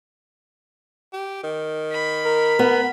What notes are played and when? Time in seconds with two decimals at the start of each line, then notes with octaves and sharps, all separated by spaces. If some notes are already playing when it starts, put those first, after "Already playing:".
1.13 G4
1.43 D#3
1.92 B5
2.25 A#4
2.59 B3